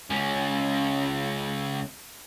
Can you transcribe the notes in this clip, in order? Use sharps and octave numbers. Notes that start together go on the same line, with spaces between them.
C#2 C#4